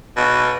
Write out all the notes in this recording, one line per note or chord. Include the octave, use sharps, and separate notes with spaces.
B2